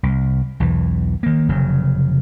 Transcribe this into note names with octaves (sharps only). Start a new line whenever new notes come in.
C2
B1 E2 E3
D#3 A#3
F1 C#3 F#3